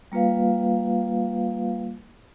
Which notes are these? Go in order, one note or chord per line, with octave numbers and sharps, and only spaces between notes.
G3 A#3 F4 B4 F5